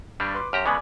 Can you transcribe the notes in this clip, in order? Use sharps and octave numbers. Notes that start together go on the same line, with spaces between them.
G2 G3 D4
B4 C6 D6
F#2 G4 A#5 C6 F6
C#3 G#3 B3 D5 G#5 B5